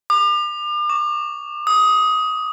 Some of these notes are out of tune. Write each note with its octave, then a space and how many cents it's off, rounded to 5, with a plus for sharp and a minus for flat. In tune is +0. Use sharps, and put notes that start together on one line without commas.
D6 +40
C#6 +45
D#6 +15